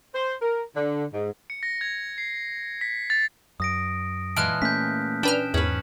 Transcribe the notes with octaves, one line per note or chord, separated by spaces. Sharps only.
C5
A#4
D3
G#2
C#7
A#6
G#6
C7
B6
A6
F#2 D#6 A#6 D7
A#2 E3 G#3 A5 F6 F#6 D7
A3 A#3 C#4 G6 B6
C#4 D4 B4 G5 F6 E7
E2 G#2 C#4 B4 F#7